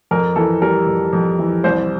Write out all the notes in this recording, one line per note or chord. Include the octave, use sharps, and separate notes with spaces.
F2 A#4
E3 A4
G3 A#4
F2
F2
E3
C2 C5